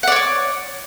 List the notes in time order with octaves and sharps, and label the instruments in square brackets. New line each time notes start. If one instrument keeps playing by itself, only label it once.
[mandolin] F#5
D5
C#5
D6